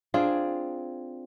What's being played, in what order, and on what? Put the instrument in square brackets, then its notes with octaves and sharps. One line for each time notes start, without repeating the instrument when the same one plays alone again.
[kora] C4 D4 F4 G#4